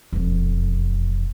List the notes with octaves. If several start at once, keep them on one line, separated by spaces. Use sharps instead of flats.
E1 F2